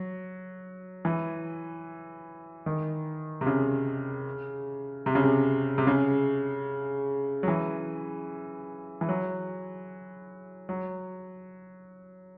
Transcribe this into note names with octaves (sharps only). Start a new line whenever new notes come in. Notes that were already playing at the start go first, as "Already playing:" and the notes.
Already playing: F#3
E3
D#3
C3
C#3
C3
C#3
C3
C3
C#3
F#3
E3
E3
F#3
F#3